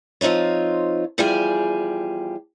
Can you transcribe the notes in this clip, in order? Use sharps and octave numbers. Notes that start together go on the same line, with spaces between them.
F3 C4 D#4 F4 C#5
E2 F3 G3 G4 G#4 G#5